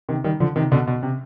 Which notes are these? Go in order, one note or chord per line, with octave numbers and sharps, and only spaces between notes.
C3 D#3
D#3 G3
D3 F3
C3 D#3
B2 D3
B2
C3